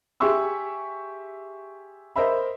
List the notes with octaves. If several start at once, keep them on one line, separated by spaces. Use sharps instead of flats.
G4 G#4 E5 C6 C#6 E6
A#4 C5 D#5 E5 B5